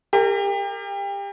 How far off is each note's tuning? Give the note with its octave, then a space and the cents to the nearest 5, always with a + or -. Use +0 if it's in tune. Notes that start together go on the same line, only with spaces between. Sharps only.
G4 +30 A#4 -30